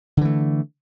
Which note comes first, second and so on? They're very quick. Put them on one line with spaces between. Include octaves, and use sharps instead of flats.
D3 E3 A3